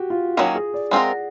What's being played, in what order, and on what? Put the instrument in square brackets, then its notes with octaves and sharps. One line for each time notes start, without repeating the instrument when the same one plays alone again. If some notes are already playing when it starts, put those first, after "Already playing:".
Already playing: [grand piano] F#4 G4
F4
[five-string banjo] D#3 F#3 A#3 C#4 [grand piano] F4
[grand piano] G#4
D5
[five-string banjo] G#3 C4 F4 A#4 [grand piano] F#5